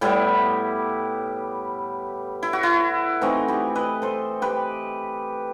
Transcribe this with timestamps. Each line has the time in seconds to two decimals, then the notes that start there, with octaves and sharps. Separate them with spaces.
0.01 A2 G3 B3 E4 G4
2.43 E4
2.53 F#4
2.63 E4
3.21 E3 A3 C4 D#4 F#4
3.48 E4 G4
3.75 B4 D#5
4.02 A4 C5
4.42 G4 B4